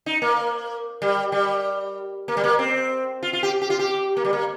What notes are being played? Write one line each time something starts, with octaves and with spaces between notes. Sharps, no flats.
D#4
A#3
G3
G3
A#3
G3
A#3
C4
F4
F4
G4
G4
F4
G4
A#3
G3
A#3